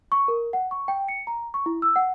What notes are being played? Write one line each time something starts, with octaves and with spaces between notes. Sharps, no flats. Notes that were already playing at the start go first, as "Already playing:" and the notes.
C#6
A#4
F#5
C#6
G5
C#7
A#5
C#6
E4
E6
F#5